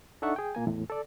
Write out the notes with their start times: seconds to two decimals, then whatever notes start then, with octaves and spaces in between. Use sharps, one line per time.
0.22 D4 D#4 A4 E5 F#5 C#6
0.36 G#4 G5
0.55 A#2 A#3 G#5
0.67 E2 A2
0.90 A4 D5